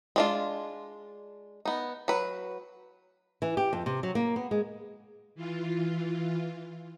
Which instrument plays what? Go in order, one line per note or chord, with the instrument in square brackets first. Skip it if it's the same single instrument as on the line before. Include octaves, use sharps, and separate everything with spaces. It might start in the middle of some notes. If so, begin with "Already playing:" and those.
[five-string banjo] G#3 D4 F4
B3 D#4
F#3 B4
[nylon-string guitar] E3
G4
F2
C3
F#3
A#3
B3
G#3
[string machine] E3 F4